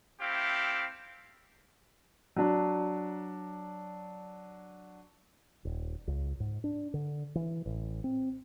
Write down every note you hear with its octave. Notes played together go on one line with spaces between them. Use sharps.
A3 C4 E4 G4 F5
F#3 D4
D#1
C#2
G#2
D4
D3
E3
A1
C4